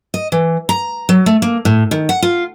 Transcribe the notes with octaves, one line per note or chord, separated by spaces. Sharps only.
D#5
E3
A#5
F#3
A3
A#3
A2
D#3
F#5
F4